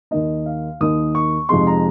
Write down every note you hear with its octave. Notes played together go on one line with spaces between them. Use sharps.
D#2 D#3 A#3 D#4 D#5
F5
D#2 D#3 A#3 D#4 D#6
C#6
F2 C3 F3 G#3 D#4 C6
A#5